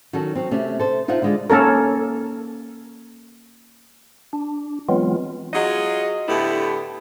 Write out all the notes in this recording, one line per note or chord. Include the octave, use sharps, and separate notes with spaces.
D#3 F#3 C#4 F#4 A4
F#3 C4
C3 A3 C#4
A4 C5
D#4 F4 C5 E5 F#5
D3 G#3 F4
A#3 C#4 A4 A#4
D4
E3 F#3 G#3 B3 C4 F4
F#3 F4 F#4 G#4 D#5
A2 D3 A3 B3 E4 G4